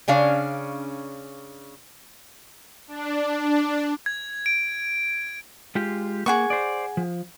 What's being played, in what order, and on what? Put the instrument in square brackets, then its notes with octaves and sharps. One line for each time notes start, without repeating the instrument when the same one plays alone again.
[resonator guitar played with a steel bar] C#3 C#4 D4 F5
[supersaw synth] D4
[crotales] G#6
D7
[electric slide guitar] G#3 F4 G4
[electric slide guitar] A#3 [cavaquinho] G#4 F#5 C#6
[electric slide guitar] C5 D5
F3